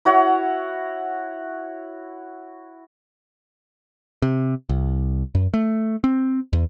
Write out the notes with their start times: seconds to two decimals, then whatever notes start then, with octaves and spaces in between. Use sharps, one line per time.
0.05 E4 F#4 C#5 F#5
4.22 C3
4.69 C2
5.35 F#2
5.54 A3
6.04 C4
6.53 E2